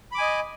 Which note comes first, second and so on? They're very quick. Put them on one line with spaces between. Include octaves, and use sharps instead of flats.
B5 D6 G#5 D#5